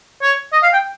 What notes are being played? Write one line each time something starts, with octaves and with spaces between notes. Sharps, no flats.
C#5
D#5
F5
G5